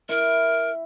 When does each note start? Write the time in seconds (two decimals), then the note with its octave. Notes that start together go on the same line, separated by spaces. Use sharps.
0.09 E4 A#4